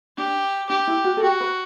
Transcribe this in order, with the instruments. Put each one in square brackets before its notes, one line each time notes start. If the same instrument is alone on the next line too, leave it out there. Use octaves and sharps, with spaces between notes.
[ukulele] D4 [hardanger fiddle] G4
[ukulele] D4 [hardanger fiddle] G4
[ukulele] E4
F#4
A4
[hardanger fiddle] F#4 [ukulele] G4
[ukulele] B4